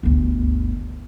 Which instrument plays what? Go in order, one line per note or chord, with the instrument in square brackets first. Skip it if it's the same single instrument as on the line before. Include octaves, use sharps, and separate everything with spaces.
[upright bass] G1 D2